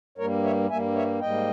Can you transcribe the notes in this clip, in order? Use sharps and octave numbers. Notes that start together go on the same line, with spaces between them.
G2 G3 A#3 A#4 C#5
C#5 E5
G2 G3 A#3 E5 G#5
C#5 E5
G#2 G3 A#3 D#5 G5